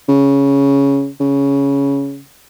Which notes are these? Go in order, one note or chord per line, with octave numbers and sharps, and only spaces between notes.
C#3
C#3